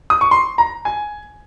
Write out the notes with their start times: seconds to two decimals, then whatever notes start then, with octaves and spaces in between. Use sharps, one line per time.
0.10 D#6
0.21 C#6
0.31 C6
0.58 A#5
0.85 G#5